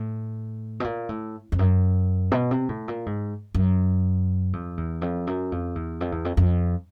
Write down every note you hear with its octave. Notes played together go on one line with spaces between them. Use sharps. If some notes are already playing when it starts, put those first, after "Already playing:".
Already playing: A2
B2
A#2
A2
F2
F#2
B2
C3
A2
A#2
G#2
F#2
F2
E2
F2
F#2
F2
E2
F2
E2
F2
F2